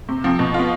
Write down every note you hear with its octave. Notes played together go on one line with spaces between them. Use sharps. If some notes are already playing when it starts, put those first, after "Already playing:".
C3
F3 C4
B2
B3 F4